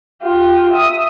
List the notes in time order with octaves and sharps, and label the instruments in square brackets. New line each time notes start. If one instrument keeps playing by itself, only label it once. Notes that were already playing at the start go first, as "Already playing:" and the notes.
[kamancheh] F4 G4
E5 D#6